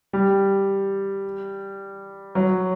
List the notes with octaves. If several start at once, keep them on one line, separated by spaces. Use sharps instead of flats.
G3
F#3